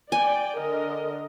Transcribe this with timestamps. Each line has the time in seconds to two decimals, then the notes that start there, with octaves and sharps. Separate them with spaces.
0.12 D5 G5 G#5
0.59 D3 A#4 D#5